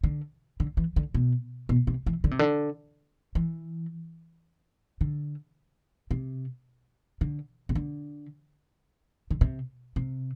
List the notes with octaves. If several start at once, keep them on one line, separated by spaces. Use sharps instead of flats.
D3
D3
E3
D3
B2
B2
C3
E3
D3
C3
D3
E3
D3
C3
D3
C3
D3
D3
C3
C3